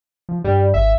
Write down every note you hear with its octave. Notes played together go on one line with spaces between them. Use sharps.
F3
G2 G3
G#1 E5